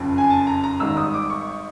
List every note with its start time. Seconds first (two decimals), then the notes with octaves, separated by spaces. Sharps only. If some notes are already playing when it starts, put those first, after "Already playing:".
Already playing: F#1 F2 C#3
0.18 G#5
0.30 A5
0.47 A#5
0.64 A#5
0.80 G#1 G#2 D#3 G3 E6
0.97 D#6
1.14 D6
1.30 C#6